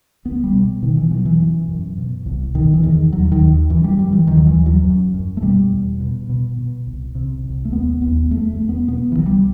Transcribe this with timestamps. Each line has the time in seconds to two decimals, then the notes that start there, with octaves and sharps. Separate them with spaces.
0.25 C2 B3
0.44 G3
0.54 B2
0.82 B2 D#3
0.97 E3
1.11 B2 F#3
1.25 E3
1.40 F#2
1.68 F#2
1.98 B2
2.26 C2
2.55 B2 D#3
2.73 E3
2.83 E2 D#3
3.12 D#2 F#3
3.32 D#3
3.42 D#2
3.70 F#2 E3
3.84 G3
3.98 F#2 G3
4.13 E3
4.27 D#2 D#3
4.38 F#3
4.47 E3
4.57 D#2
4.66 F#3
4.85 F#2
5.14 F#2
5.37 A3
5.42 B2 G3
5.71 E2
6.00 B2
6.29 B2
6.58 B2
6.87 C2
7.15 C3
7.43 C2
7.65 A3
7.72 D#2 B3
8.01 D#2 B3
8.30 E2 A3
8.50 A3
8.58 E2
8.69 B3
8.88 B2 B3
9.12 E3
9.17 C2 F#3
9.26 G3